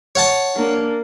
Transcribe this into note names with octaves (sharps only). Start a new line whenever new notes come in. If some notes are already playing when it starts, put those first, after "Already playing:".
C#5 F#5 A5
A#3 D4